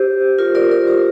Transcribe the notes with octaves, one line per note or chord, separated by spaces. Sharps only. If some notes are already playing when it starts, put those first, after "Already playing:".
Already playing: G4 C5
F4 A#4
A#4 D5
A#4 D5
G4 C5